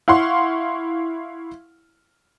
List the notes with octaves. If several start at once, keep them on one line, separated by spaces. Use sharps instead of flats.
E4 F5 F#5 C6 C#6